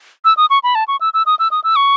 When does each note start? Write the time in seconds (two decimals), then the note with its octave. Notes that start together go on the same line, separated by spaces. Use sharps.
0.25 E6
0.37 D#6
0.50 C#6
0.63 B5
0.75 A5
0.88 C#6
1.01 E6
1.14 E6
1.26 D#6
1.39 E6
1.51 D#6
1.64 E6
1.76 C#6